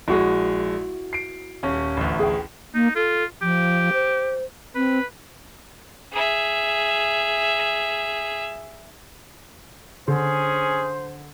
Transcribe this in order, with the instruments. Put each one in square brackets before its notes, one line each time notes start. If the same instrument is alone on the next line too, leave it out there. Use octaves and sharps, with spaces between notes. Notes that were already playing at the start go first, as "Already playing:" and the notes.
[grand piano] A#1 G#3 [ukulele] E4 F#4
[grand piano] C7 D7
D#1 C#4
A1 D2
[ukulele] G#4 G5
[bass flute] A#3 [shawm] D#4
[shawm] F4 [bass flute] A4
[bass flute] F3 [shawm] G4
[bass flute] C5
[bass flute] C4 [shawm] B4
[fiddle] G#4 E5
[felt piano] D3 [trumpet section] C#4 G#4 [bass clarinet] C5